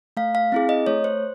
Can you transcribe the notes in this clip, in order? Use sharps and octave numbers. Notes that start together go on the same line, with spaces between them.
A3 F5
F5
C4 E4 G#4
D#5
A3 C#5
C5